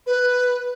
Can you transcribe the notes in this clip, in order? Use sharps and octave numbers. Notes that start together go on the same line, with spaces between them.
B4